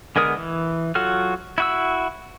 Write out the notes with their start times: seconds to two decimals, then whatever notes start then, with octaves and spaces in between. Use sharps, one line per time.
0.16 D3 G#3 B3 A#4 D#6
0.37 E3
0.95 F#3 F4 F#4 A4 F6
1.58 E4 F#4 E6